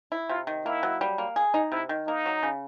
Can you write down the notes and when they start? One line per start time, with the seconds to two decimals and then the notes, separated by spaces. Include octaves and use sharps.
0.12 E4
0.29 C3 F4
0.47 D#3
0.65 A#3 E4
0.83 F#3
1.01 G3
1.18 A#3
1.36 G#4
1.54 D#4
1.72 C3 E4
1.89 D#3
2.07 A#3 D#4
2.26 F#3
2.43 C#3